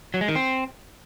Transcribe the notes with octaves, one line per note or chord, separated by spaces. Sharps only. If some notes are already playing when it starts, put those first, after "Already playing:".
F#3
G#3
D#3
C4